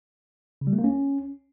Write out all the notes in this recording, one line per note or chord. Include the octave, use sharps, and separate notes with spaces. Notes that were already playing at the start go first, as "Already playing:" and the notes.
C#3
G3
A3
A#3
C#4